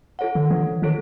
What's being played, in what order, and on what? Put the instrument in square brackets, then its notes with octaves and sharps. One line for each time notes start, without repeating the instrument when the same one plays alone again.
[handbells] F4 A4 C#5 F#5
[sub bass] D3
D#3
[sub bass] E3 [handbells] D4
[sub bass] D#3 [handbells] F4 A4 C#5